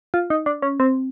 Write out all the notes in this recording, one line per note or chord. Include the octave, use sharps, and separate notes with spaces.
F4
D#4
D4
C#4
C4